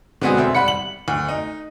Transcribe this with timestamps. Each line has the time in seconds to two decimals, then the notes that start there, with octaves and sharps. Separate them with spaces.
0.21 D3 G#3 B3 C4 F#4 G#4
0.37 E1 C4 E5
0.55 G3 F#5 B5 C#7
0.68 F#7
1.08 D2
1.29 D#4